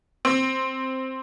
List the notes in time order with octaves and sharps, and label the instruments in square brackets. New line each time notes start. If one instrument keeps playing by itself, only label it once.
[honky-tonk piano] C4